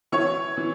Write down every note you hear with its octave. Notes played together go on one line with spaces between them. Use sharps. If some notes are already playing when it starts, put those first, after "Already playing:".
E3 C#5 C#6
E3